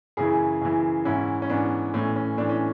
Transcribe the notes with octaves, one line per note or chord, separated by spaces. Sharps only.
F#2 C#3 E3 E4 G#4
F#2 C#3 E3
G#2 E3 C#4 E4
C#4
G#2 E3 B3 D4
A2 E3 C#4
C#4
A2 E3 D4
C#4